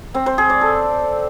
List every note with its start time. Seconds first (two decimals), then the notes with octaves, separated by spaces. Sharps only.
0.14 C4
0.26 C5
0.38 G#4
0.50 D5
0.61 A4